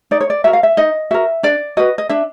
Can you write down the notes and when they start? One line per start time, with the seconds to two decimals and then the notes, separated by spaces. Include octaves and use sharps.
0.11 D#4 D5
0.21 C#5
0.30 D5
0.44 F#4 A#4 E5
0.53 F5
0.63 E5
0.77 D#4 D#5
1.11 F#4 A#4 E5
1.43 D4 D5
1.77 F#4 B4 D#5
1.98 D#5
2.09 D4 E5